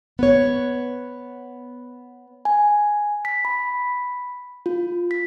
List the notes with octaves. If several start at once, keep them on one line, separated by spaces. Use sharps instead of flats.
B3 B4 C#5
G#5
B6
B5
F4
B6